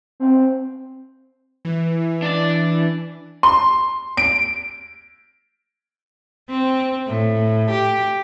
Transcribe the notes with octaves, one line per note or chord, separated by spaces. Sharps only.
C4
E3
D4 A5
C6
D7
C4
A2
G4